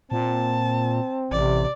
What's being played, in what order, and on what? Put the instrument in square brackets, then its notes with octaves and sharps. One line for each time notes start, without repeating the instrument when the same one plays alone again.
[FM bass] A#2 [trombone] C4 [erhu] A5
[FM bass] A1 [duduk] C3 [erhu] D5